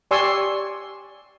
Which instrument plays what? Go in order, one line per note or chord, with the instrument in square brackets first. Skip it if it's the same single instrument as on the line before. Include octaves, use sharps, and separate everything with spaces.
[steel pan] G4 D5 G#5 C6 C#6 E6